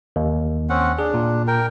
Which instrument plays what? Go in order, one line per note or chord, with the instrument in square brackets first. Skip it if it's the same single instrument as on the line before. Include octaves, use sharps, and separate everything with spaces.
[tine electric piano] D#2
[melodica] C4 C#4 F#5
[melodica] D4 [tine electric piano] G#4
[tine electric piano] A#2
[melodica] A#4 G5